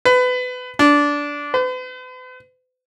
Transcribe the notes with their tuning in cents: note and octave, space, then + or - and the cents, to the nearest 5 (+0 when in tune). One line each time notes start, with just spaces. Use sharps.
B4 +25
D4 -15
B4 +45